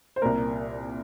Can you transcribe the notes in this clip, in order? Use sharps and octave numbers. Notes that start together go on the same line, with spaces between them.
C5
C2 A#2 A#4